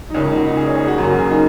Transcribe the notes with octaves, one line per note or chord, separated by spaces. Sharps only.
D#4
C#2 C#3 A#3 C#4
D#4
F#4
D#4
G#4
C#5
G#4
F#4
F#2 C#3 F#3 A#3 F#4
G#4
D#4